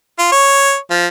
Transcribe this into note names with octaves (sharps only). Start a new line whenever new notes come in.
F4
C#5
F3